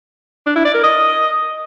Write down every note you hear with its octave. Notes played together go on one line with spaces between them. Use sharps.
D4
E4
D5
A#4
D#5